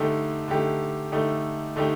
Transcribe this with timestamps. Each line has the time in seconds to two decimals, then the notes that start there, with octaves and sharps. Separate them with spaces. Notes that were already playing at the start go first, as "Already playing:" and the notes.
Already playing: D3 A3 D#4 G4
0.48 D3 A3 D#4 G4
1.12 D3 A3 D#4 G4
1.76 D3 A3 D#4 G4